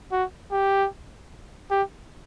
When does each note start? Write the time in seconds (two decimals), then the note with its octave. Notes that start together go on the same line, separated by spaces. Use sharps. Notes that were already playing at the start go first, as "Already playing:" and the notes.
0.12 F#4
0.51 G4
1.71 G4